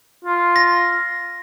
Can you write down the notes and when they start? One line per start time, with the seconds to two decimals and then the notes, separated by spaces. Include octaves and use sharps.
0.25 F4
0.56 A#6